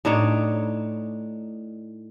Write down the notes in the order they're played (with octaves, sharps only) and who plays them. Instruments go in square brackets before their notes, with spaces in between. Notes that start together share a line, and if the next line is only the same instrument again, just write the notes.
[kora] A2 D4 D#4 C#5